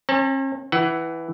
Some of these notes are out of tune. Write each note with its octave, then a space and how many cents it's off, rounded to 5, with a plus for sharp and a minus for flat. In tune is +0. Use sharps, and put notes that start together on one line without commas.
C#4 -45 A5 +30
E3 +0 F#5 +25